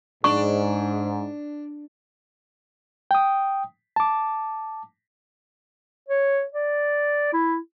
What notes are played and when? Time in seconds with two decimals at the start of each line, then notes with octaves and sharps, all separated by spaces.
0.24 G#2 D4 C#6
3.11 G5 D#6
3.96 A5 D6
6.09 C#5
6.53 D5
7.33 E4